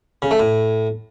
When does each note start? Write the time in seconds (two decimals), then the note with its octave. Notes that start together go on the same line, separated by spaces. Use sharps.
0.22 C#3
0.31 A3
0.40 A2